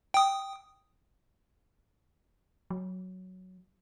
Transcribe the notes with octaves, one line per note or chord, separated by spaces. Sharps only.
G5 D#6
F#3